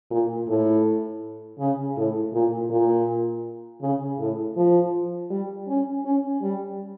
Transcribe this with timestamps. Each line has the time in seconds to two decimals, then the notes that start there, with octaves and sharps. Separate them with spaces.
0.11 A#2
0.48 A2
1.59 C#3
1.97 A2
2.33 A#2
2.70 A#2
3.81 C#3
4.19 A2
4.56 F3
5.30 G3
5.68 C#4
6.05 C#4
6.42 G3